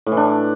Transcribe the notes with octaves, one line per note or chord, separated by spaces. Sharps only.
A2
E3
D4